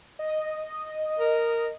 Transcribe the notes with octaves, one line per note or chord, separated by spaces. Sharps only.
D#5
A#4